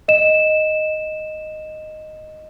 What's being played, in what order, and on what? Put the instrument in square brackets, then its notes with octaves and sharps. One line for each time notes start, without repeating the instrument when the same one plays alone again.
[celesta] D#5 E7